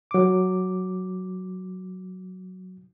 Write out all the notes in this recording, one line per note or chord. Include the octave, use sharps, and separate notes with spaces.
F#3 D6